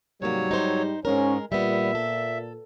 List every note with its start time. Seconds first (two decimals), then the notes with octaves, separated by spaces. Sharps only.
0.22 G#2 C3 F#3 G3 A#3 C#5
0.51 D#4 C5
1.05 G#2 G#3 C#4 A#4
1.52 A#2 G3 B3 E5
1.95 A4